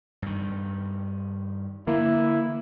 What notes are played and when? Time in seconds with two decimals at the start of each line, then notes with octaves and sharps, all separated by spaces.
0.22 G2 D#3
1.87 D3 E3 A#3 E4